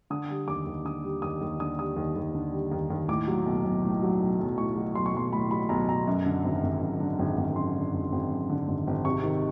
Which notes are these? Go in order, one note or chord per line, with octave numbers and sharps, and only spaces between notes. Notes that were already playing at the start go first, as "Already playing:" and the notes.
D3 D#6
G3
D#2 D6
D#2
D3 D#6
G3
D#2 D#6
D#2
D3 D#6
G3 D#6
D#2
D#2
D3
G3
D#2
D#2
A2 D6
F#3
B1
B1
A2
F#3
B1
B1
A2 C#6
F#3
B1 C6
C#6
B1 C6
A2 B5
F#3 B5
B1 A#5
B1 A#5
F#2
D3
G#1
G#1
F#2
D3
G#1
G#1
F#2 C6
D3
G#1
G#1
F#2
D3
G#1
G#1
C3 C#6
D#3